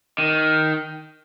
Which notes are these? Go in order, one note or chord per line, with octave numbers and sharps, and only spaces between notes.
D#3